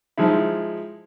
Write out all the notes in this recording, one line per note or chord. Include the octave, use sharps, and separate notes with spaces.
F3 G#3 D#4 E4